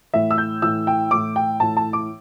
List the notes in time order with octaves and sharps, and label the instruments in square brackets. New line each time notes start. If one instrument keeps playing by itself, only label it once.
[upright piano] A2 E3 E5
E6
G6
A2 E3 E6
G5
A2 E3 D6
G5
A2 E3 A5
A5
D6